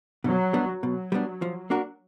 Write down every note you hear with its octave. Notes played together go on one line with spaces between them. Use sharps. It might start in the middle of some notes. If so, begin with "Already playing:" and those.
B2 F#3
G3 B3 D4
B2 F#3
G3 B3 D4
F3
A#3 D4 F#4 A#4